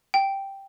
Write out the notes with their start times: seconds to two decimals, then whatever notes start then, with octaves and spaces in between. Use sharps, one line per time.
0.14 G5